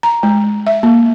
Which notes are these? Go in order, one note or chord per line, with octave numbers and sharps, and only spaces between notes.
A#5
G#3
E5
A#3